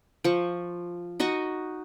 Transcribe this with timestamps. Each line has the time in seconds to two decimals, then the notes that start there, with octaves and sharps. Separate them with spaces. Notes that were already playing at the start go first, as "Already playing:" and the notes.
0.24 F3 C#6
1.20 D#4 F#4 D#5 C#6